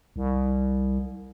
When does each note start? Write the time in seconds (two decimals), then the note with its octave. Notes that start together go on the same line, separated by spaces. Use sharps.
0.16 C2